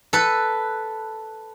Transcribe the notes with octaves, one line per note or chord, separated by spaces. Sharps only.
A4 B4